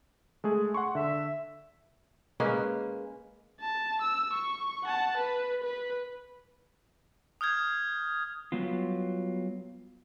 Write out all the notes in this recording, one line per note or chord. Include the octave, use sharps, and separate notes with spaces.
G#3 A3 G#4
F#5 C6 C#6
D3 E5
G#3 A#3 C#4 B4
A5
E6
C#6
F#5 A5
B4
B4
D#6 F6 G6 G#6
F#3 G3 B3 F4